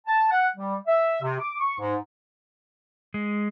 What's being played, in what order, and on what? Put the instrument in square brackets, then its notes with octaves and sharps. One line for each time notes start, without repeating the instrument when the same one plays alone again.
[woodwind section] A5
F#5
G3
E5
C3
D6
C#6
G#2
[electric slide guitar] G#3